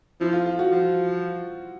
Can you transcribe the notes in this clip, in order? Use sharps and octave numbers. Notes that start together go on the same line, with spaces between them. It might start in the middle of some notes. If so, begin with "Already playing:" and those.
F3 E4
F4
F4
F#4
F3 F4